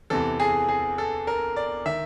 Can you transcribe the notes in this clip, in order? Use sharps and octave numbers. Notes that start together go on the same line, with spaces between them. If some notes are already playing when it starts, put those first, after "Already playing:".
E2 C3 E3 A4
G#4
G#4
A4
A#4
D5
D#3 E5